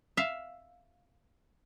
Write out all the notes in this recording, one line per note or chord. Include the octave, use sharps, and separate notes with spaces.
E5 F5